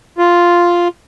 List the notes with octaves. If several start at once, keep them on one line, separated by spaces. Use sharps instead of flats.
F4